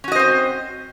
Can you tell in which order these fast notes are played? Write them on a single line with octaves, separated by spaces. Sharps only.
C#4 F#4 D#5 C5 C4